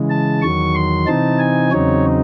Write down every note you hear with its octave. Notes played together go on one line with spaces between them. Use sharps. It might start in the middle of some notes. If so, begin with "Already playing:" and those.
Already playing: C#3 E3 G#3
A5
E2 D#3 F#3 C#6
C6
C3 E3 C4 D#4 A5
G#5
E2 C#3 F#3 C4 D#4 C#5